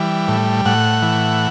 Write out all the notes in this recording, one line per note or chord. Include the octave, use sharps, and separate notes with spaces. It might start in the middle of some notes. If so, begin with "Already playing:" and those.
Already playing: E3 G3
A2
A2 F#5
E3